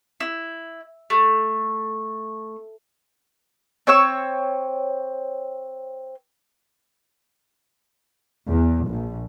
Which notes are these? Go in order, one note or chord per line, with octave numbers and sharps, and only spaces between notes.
E4
A3
C4 C#5 C#6 E6
E2
A#1